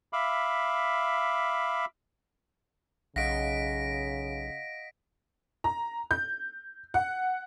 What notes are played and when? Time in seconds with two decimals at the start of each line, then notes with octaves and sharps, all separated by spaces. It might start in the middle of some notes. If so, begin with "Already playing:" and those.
0.13 E5 F5 B5 D6
3.16 B1 C#3 D#5 F5 F#5 A#6 B6 D7
5.64 A#5
6.11 G6
6.94 F#5